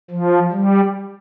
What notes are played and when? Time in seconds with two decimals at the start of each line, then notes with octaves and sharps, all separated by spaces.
0.11 F3
0.52 G3